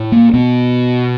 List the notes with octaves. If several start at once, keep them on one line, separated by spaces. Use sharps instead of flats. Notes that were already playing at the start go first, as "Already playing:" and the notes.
Already playing: A2
A#3
B2 B3